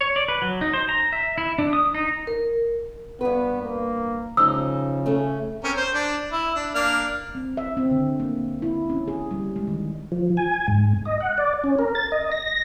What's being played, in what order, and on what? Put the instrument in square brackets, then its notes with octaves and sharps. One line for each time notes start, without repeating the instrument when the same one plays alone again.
[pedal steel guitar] C#5
D5
B4
F#3
D#4
C5
A#5
E5
E4
D4
D#6
D#4
[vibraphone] A#4
[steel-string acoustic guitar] G2 B4 [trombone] B3
[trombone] A#3
[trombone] C#3 [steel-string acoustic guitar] F3 D#4 [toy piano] E6
[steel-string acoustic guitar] A3 C#4
[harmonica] C4 C#4 A#4
C5
D4
E4
D4
A#3 D4 F6
[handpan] C4
E5
C4
D3
A#3
E4
C#4
G#4
G3
G#3
D#3
[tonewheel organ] F3
G#5
G#2
D#5
F#5
D5
C#4
A#4
A6
D#5
A#6